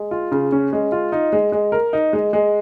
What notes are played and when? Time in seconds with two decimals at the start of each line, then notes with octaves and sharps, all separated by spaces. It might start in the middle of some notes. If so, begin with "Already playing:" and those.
Already playing: G#3
0.11 F4
0.32 C#3
0.52 C#4
0.73 G#3
0.92 F4
1.12 D#4
1.33 G#3
1.52 G#3
1.72 A#4
1.93 D#4
2.13 G#3
2.33 G#3